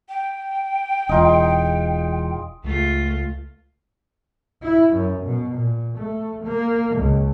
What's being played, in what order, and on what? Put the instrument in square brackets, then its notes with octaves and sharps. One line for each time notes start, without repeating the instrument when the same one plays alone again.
[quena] G5
[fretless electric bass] E1 [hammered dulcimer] D#4 F4 G#4
[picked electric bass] C#2 [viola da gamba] A3 F4
[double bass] E4
F#2
B2
A#2
A3
A#3
C#2